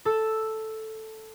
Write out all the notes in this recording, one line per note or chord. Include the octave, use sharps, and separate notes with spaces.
A4 E6